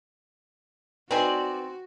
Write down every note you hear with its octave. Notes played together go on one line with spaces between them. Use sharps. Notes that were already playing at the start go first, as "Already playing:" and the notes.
C4 D#4 F#4 B4 D5 G#5 C6